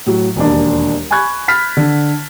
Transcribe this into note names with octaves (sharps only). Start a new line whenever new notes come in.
A2 F#3
E1 D#2 D4
G#5 B5 C#6 F#6 G#6
B5 F6 A6 B6
D3